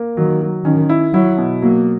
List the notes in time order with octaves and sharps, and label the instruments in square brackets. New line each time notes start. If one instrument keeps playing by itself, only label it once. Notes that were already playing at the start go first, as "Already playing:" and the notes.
Already playing: [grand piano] A#3
[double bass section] D#3 [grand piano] F#3
[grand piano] F#3
[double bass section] D#3 [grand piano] C#4
[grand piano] E4
[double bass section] F#3 [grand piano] E4
[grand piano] B2
[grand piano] F#3 [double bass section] A#3